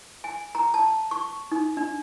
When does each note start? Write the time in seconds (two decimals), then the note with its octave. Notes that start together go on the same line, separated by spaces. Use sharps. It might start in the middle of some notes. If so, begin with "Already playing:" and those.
0.24 G#5
0.55 A#5
0.74 A5
1.11 C#6
1.52 D#4
1.77 D4